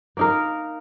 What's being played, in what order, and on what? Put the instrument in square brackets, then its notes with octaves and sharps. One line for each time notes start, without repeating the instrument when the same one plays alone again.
[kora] A#3 D#4 A#4